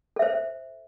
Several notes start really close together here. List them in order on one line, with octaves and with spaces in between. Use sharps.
A4 E5 C5